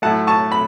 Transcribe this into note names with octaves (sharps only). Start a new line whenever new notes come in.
A2 F#3 A3 F#5 A5
A5 C#6
B5